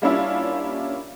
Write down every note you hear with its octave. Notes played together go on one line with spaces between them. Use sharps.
G3 A#3 C#4 D4 E4 F4